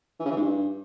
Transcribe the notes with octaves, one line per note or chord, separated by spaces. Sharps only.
E3
C#3
E3
G#2
G2